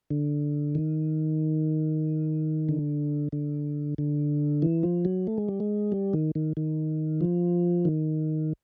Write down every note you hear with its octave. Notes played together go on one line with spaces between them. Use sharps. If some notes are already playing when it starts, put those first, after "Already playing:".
D3
D#3
D3
D3
D3
E3
F3
F#3
A3
G#3
G3
G#3
G3
D#3
D#3
D#3
F3
D#3